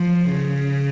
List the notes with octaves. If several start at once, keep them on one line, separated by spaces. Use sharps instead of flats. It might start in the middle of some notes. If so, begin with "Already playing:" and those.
Already playing: F3
C#3